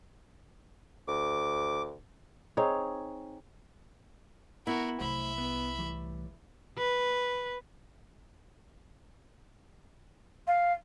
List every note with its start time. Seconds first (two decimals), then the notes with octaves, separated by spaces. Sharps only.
1.08 D2 D6
2.57 C4 D#4 G#4 C#5
4.67 B3 E4 F#4 A#4
5.00 C2 F#3 A3 C5 E5 B5 C6
5.38 B3
5.78 A2 E3 G3
6.78 B4
10.47 F5